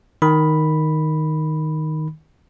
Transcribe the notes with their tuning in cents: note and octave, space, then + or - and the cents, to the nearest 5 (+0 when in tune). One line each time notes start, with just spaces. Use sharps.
D#3 +0 B5 +0